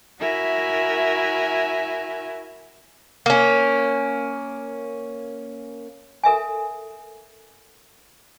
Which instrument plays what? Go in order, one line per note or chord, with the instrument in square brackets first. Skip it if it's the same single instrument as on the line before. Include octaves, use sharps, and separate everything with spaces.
[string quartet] E4 F#4 A#4 E5 G#5
[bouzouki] A#3 C#4
[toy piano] A4 A#4 E5 G#5